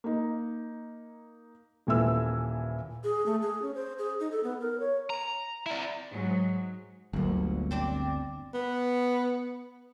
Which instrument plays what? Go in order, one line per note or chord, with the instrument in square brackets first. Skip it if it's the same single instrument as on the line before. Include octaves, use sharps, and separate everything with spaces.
[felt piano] A#3 D#4
D#1 A#2 E3 E6
[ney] G#4
A3
G#4
C#4
C5
G#4
D#4
A4
B3
A#4
C#5
[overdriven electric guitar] A#5
E4 D5
[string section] G#2 F#3
[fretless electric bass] G1 D2 [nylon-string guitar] F#3 A#3
[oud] C4 D4 D5
[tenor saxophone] B3